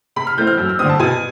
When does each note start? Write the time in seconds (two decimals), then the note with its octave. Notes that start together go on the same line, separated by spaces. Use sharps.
0.16 C3 B5
0.27 F6
0.37 E3 A3 C4 G6
0.47 F6
0.58 F#2 E6
0.69 E6
0.79 D3 G3 C4 D#6
0.90 A5
0.99 B2 G#5